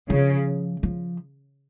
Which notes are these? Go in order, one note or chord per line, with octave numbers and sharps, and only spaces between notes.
C#3 F3
F3